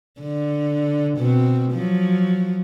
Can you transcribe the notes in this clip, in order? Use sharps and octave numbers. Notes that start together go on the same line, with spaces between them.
D3
B2 C4
F3 F#3